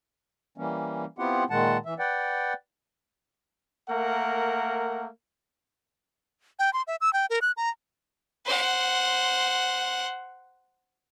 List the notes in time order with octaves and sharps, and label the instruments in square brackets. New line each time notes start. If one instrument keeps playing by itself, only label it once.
[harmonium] E3 G3 A#3 C#4
B3 C4 E4 F4 G4 F#5
A#2 D#3 G#3 F#5 A5
E3 E5
B4 D5 F#5 G5
[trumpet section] A3 A#3 A#4 F#5
[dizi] G5
C6
E5
E6
G5
A#4
F#6
A#5
[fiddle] C5 F#5